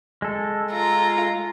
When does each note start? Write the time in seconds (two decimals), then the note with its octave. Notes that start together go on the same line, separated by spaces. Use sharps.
0.22 G#3 A4
0.71 F4 A#5